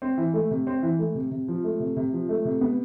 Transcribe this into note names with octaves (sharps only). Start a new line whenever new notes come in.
C4
E3
A3
C3
C4
E3
A3
C3
C3
F3
A3
C3
C3
F3
A3
C3
B3